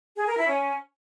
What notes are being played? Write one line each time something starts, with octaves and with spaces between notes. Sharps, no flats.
G#4
A#4
E4
C#4